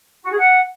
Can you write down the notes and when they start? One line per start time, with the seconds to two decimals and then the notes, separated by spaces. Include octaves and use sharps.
0.23 F#4
0.31 G#4
0.38 F#5